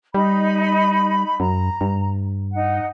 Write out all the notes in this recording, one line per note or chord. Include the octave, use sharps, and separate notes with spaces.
G3 D#4 B5
F#2 A#5
G2
D#4 F#5